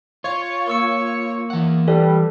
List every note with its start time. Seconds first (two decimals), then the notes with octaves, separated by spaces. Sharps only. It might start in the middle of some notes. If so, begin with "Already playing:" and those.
0.24 F4 C#5
0.68 A#3 C#6 E6 C#7
1.50 E3 F#5
1.88 G3 A4 B4